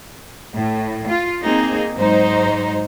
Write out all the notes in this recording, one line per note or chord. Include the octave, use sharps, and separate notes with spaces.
A2
F4
A#3 C4 D#4 G#4
G#2 F#3 D#4 C5